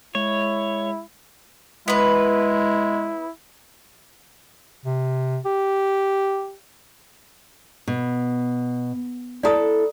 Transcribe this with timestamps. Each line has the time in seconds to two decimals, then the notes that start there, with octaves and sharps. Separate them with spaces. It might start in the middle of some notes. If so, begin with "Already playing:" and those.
0.15 G#3 E4 C#5
1.88 G#3 B3 E4 B4
4.86 C3
5.45 G4
7.88 B2
9.43 E4 A4 D5 A#5 D#6